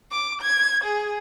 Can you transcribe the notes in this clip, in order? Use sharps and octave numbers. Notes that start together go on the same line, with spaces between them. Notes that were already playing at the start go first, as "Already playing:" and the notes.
D6
G#6
G#4